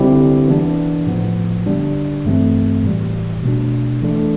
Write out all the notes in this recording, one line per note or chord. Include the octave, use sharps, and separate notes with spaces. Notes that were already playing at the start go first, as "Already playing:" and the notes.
Already playing: D3 G3 C4 E4 G4
E3 B3 D4
A2 F3 B3
D3 G3 D4
G2 E3 A3 C4
A2 E3 G3
B2 A3 D4
E3 A3 D4 A4